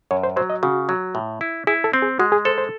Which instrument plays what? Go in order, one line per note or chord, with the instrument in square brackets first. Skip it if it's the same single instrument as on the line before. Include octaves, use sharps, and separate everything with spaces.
[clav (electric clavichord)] F#2 [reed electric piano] C#5
[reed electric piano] C5
[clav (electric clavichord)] F#3 [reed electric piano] C5
[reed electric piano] D#5
[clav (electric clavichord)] C#3 [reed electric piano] F#4
[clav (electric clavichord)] F#3
A2
E4
[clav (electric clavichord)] E4 [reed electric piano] G#4
[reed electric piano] A4
[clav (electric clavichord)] C4
[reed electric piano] G#4
[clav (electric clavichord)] G#3 [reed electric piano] F#4
[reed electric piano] G#4
[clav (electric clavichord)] A4 [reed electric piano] C5
[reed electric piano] C5